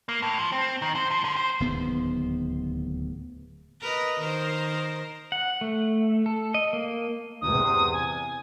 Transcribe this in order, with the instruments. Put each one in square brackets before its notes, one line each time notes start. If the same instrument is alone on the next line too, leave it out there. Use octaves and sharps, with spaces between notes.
[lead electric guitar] A#3
A2
F3
C4
D#3
C5
F3
D3
C5
[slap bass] D1 D#2 B3
[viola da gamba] A#4 B4 D#5
D#3 A#4 C5
[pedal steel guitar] F#5
A3
A4
D#5
A#3
[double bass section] E2 C3 [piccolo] D#6
[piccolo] G#5